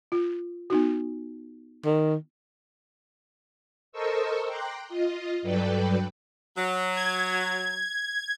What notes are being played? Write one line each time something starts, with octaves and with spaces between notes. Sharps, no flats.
F4
B3 D#4 F#4
D#3
A4 A#4 C5 D#5 C#6 E6
G5 A#5 C6 D6 F#6
F4 D#5
G2 F#3 A4 B4 D5 G5
F#3
G#6